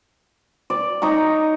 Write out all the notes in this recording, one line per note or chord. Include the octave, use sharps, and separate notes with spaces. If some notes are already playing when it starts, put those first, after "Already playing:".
D5
D#4 C#5 A#5